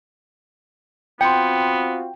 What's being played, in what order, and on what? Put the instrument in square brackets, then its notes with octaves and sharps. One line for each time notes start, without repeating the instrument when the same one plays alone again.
[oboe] B3 [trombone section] C4 F4 F#4 [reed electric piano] G5 [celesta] C6 C#7